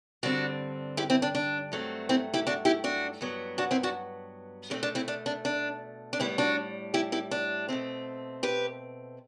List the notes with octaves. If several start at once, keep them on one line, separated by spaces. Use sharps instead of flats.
G2 D3 G3 C4 D4 F#4
E4 G4
C4 E4
D4
D4
G2 F#3 A3 C4
C4 E4
E4 G4
D4 F#4
E4 G4
D4 F#4
G2 F#3 B3
D4 F#4
C4 E4
D4 F#4
B2 A3 C4 D4
D4
C4 E4
D4
D4
D4
D4
A2 G3 B3 C4 E4
D4 F#4
E4 G4
E4 G4
D4
B2 A3 C4
G4 B4